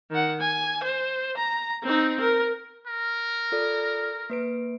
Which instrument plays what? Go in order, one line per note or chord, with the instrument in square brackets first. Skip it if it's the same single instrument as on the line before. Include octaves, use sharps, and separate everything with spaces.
[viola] D#3 F#5
G#5
C5
A#5
C4 D#4
A#4
[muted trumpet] A#4
[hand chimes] F4 A4 D5
A#3 B4 D7